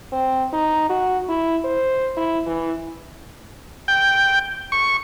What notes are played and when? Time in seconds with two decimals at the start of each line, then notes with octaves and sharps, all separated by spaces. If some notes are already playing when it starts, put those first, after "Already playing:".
0.12 C4
0.53 D#4
0.89 F#4
1.28 E4
1.65 C5
2.17 E4
2.46 E3
3.88 G5
4.72 C#6